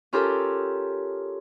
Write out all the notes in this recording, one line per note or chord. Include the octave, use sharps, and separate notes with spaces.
C#4 F4 G4 A4 A#4